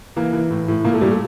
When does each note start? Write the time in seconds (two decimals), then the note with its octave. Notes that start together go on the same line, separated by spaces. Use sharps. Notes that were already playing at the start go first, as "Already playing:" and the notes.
0.16 E3 A#3
0.33 E3
0.50 A2
0.68 A2
0.85 A#2 A#3
0.93 A3
1.01 A#2 G3
1.11 A3